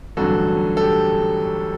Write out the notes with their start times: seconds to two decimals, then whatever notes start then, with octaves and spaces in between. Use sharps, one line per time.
0.17 A1 G2 D3 F#3 F#4 A4
0.77 A4
0.81 G4